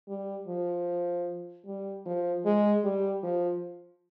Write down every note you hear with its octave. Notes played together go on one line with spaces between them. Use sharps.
G3
F3
G3
F3
G#3
G3
F3